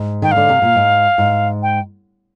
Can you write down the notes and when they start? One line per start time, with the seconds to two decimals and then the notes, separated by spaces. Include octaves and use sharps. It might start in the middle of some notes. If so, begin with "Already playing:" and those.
Already playing: G#2
0.22 D#3 G5
0.31 D3 F5
0.49 C3
0.62 A#2
0.75 G#2
1.18 G#2
1.63 G5